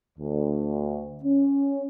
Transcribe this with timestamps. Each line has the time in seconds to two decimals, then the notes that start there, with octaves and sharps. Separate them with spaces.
0.18 D2
1.23 C#4